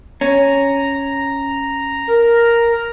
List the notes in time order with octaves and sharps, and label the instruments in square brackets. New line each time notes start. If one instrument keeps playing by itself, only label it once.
[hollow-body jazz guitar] C#4 [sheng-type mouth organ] A#5
[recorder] A#4